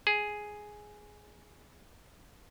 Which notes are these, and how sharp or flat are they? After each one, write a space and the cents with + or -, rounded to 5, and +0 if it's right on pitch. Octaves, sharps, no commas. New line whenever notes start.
G#4 +5